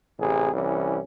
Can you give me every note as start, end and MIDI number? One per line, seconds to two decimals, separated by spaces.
0.19 0.53 33
0.19 0.53 48
0.19 0.53 68
0.53 1.00 36
0.53 1.00 52
0.53 1.00 61